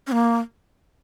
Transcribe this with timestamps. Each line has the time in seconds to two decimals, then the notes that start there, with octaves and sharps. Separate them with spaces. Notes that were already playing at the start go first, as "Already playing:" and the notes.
0.07 C#4
0.12 A#3